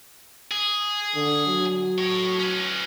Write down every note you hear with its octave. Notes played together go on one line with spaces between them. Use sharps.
G#4
D3
F#3
A2 C#5
C#4 B4